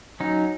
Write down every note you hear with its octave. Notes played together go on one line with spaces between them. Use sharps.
F#3 C#4 D#4